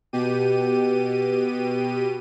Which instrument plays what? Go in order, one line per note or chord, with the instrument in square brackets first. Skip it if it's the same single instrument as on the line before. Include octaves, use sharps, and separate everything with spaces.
[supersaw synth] B2 G4 D#7